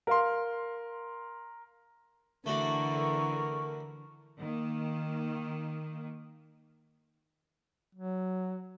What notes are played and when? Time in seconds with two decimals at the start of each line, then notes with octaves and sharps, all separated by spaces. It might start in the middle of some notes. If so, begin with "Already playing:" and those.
0.07 A#4 F5 C6
2.46 D3 E3 A3 D4 F#4 A#4 C#6
4.40 D#3 A#3
7.95 F#3